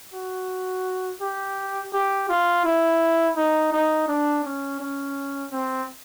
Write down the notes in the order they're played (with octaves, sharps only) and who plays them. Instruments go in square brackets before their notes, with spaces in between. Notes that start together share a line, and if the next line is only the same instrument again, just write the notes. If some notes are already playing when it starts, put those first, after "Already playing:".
[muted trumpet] F#4
G4
G4
F4
E4
D#4
D#4
D4
C#4
C#4
C4